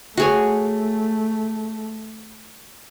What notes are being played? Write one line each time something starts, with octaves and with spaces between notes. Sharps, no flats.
A3 F#4 G#4 C#5